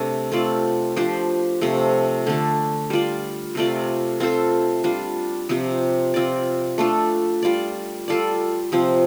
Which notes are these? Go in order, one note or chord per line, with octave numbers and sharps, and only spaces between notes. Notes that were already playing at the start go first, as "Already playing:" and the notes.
Already playing: C3 A3 D4
A3 C4 F4 D5
F3 D4 G4 C5
C3 F3 A3
D3 A3 D4 A4
G3 F4 D5
C3 A3 F4 D5
C4 F4 A4 C5
G3 D4 F4
C3 F3 C4 G4
C4 F4 D5
A3 D4 F4 A4
G3 F4 D5
G3 F4 A4 D5
C3 F3 C4